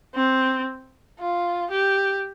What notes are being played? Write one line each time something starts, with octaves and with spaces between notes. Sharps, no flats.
C4
F4
G4